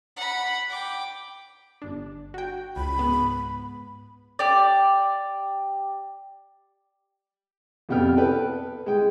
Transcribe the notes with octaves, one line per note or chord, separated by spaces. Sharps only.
F#5 B5
G5 D6
G1 D4
F#4 G5
C#2 B5
G#2 B3
G4 D5
F2 C3 B3 G5 F6
A4 B4 G5
G#3 G5